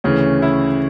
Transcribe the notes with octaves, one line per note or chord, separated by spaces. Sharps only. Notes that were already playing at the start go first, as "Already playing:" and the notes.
D2 C#3 E3 C#4
E4